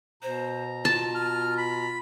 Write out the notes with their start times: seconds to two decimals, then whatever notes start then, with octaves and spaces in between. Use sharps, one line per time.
0.23 B2 C5 A#5
0.85 F4 A5
1.15 F6
1.58 B5